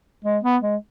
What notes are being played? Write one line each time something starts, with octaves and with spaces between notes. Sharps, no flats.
G#3
B3
G#3